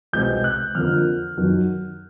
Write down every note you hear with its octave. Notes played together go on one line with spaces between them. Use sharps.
C2 B2 G#3 C4 G6
F#6
F2 D3 F3 A#3 F6
F#2 D#3 F#3